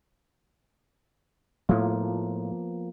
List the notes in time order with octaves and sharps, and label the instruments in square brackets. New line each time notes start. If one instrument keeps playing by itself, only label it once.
[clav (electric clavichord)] A2 F4 [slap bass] F3 A#3 B3